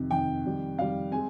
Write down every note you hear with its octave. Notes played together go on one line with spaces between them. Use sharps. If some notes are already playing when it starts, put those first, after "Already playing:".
Already playing: F2 C3 D#3
F2 C3 D#3 G5
F2 D#3 G3
F2 D#3 G3 F5
G#3 C4 G#5